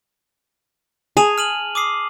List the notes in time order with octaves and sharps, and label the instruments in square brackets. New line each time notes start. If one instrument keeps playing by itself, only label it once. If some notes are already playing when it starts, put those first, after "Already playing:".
[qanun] G#4 [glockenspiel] A5 D#7 F7
[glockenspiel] F6 D#7 F#7
D6 D#6 C7